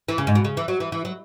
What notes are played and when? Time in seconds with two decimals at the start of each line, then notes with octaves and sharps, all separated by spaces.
0.08 E3
0.18 C#3
0.27 G#2
0.35 B2
0.45 C#3
0.57 E3
0.68 F#3
0.80 E3
0.92 E3
1.05 F#3